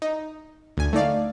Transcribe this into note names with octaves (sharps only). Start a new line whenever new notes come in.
D#4
D2 G#5
A3 D#4 D5 F5